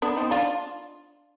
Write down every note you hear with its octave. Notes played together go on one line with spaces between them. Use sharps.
B3 D4
C4 D#4
D4 F4